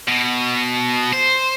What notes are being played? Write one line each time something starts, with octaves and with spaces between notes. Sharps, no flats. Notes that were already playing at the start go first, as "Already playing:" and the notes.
B2
C5